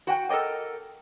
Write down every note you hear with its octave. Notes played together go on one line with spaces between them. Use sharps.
F#4 F#5 G5
A4 A#4 D5 D#5 G5